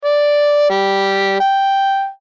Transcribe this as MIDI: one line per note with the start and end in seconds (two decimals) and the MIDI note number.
0.04 0.66 74
0.70 1.36 55
1.40 2.09 79